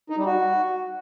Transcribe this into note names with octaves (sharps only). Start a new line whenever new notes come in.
D#4
G3
F#4